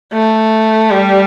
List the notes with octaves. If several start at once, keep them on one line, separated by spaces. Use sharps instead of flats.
A3
G3